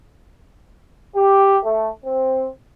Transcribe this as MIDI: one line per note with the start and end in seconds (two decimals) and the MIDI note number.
1.15 1.56 67
1.63 1.88 57
2.03 2.47 60